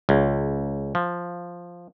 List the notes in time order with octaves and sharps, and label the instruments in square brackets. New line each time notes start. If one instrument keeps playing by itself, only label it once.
[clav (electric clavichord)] C#2
F3